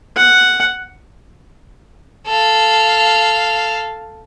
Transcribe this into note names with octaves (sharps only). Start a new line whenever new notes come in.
F#5
A4 F5